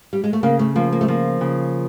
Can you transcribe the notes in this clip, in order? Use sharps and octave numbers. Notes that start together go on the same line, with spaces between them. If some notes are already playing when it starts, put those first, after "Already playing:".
G3
G#3
A3
C#3 A#3
A3
F3 A#3
A#3
A3
F3 A#3
C#3